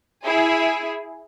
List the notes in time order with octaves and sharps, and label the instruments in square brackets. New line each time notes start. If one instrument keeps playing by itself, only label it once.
[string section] E4 G#4